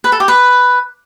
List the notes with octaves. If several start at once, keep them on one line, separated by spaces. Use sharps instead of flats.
B4
A4
G4
B4